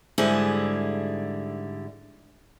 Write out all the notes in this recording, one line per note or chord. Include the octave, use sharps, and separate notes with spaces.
G#2 D3 G3 E4 G#4